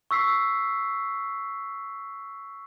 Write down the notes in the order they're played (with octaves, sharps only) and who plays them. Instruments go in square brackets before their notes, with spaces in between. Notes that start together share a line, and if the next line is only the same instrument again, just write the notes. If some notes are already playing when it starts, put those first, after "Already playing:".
[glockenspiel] C#6 E6 B6 C7